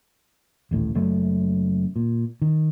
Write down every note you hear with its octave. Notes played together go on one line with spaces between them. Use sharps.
D#1 A1 A2
F#1 F#2 A3
A#2
D#3